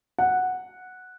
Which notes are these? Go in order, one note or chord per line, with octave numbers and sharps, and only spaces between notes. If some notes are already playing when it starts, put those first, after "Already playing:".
F#5